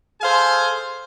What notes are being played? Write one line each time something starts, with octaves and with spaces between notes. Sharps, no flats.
G#4 A4 C5 F5 G#5